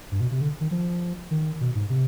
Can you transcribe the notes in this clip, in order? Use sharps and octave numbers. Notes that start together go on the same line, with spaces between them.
G2
B2
C3
D3
D#3
F3
D#3
B2
G#2
C3